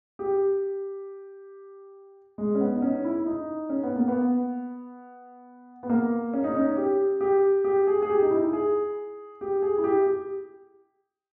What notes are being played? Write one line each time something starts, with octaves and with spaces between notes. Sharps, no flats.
G4
G#3
C#4
B3
D#4
C#4
E4
E4
D#4
C#4
B3
A#3
B3
B3
A#3
C#4
D#4
C#4
G4
G4
G4
G#4
G#4
G4
D#4
E4
G#4
G4
G#4
E4
G4
G4